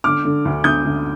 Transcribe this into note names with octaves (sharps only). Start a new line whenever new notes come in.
D3 D6 F6
D3
D2
D2 D#6 G6
D3